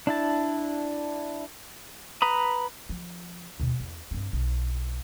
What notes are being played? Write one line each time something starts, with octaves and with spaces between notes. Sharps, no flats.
D4 E4 A5
B4 A#5 B5 D#6
F3
D#2 B2
E2
G2 C4
B1